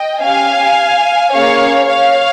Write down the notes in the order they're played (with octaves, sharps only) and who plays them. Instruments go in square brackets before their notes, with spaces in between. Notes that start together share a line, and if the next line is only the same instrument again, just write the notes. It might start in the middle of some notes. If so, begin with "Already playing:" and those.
Already playing: [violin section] D#5 G5
C#4 G4 F5 G#5
A#3 C#4 G#4 C#5 F5
C#5 F5